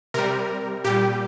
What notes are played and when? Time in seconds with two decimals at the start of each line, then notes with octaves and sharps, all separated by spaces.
0.14 C3 G3 A#4
0.84 A#2 G3 G4